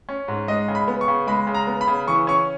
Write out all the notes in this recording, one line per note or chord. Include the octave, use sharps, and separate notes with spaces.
C#4
G#2
G#3 D#5
C#3
B5
B3
C#6
C#3
G#3 B5
C#3
A#5
B3
B5
C#3
E3 C#6
C#4 C#6